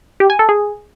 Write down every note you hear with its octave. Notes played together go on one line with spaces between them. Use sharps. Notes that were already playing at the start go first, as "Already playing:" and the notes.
G4
G#5
A4
G#4